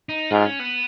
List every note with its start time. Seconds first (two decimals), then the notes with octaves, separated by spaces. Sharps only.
0.09 D#4
0.31 G#2 F4
0.45 C#4
0.59 B3